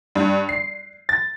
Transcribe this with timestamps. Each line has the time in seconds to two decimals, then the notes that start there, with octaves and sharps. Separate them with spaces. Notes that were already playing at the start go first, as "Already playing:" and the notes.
0.15 G2
0.49 C7
1.09 A6